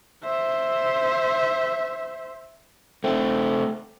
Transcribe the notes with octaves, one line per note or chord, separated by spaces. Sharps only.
C5 E5
A3 C4